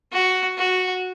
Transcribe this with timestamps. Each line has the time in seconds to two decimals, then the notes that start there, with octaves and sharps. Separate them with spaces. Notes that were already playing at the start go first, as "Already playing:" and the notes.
0.12 F#4
0.58 F#4